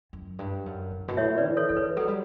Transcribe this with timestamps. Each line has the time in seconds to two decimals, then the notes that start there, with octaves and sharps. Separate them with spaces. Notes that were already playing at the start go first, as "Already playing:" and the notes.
0.13 F#2
0.39 G2
0.66 F#2
0.91 G2
1.08 B2
1.17 A2 C#5 E5
1.38 B4 D5
1.44 E3
1.57 A4 C#5
1.69 E3 A4
1.77 B4
1.97 F#3 A4
2.08 G3